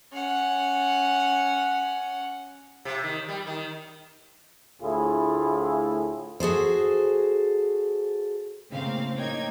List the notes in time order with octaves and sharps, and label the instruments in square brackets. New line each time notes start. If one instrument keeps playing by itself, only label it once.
[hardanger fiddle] C#4 F#5
[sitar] C3
D#3
G3
D#3
[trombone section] D2 A2 E4 F4 G#4
[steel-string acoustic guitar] F#4 G#4 A4 C5
[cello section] A2 A#3 [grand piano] C#3 [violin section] C4 F5
[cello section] A#3 D#4 [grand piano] C#5 D#5 [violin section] G5 G#6